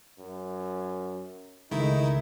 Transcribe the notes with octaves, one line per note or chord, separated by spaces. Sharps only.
F#2
C#2 D#3 G#3 A3 D#4 E4